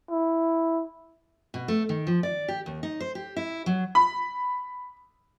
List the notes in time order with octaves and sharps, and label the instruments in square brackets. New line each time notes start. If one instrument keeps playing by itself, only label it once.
[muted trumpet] E4
[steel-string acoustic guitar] B2
A3
D#3
F3
D5
G4
D#2
D#4
C5
G4
E4
F#3
[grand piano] B5